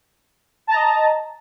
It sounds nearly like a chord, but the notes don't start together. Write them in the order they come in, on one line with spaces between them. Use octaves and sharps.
A5 A#5 D#5